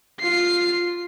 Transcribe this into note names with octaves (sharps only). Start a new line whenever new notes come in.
F4 C7